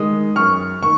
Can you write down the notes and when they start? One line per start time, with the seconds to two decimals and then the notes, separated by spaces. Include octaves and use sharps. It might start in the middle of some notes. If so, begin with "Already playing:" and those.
Already playing: D#3 G#3 D#6
0.36 F#2 C#6 F6
0.82 D#3 C#6